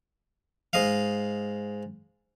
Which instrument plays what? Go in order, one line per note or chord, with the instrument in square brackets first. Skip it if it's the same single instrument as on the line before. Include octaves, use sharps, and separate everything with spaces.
[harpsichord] G#2 D#5 F5